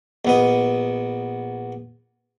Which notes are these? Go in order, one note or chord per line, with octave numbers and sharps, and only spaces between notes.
A#1 B3 D#5